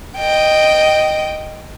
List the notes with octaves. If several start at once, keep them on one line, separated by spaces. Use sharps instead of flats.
D#5 G5